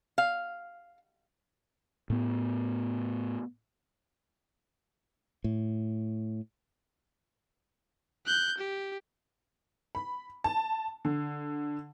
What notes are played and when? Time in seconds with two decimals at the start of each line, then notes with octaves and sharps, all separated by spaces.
0.18 F5
2.10 A2 B3
5.44 A2
8.26 F#6 G6
8.58 G4
9.95 B5
10.44 A5
11.05 D3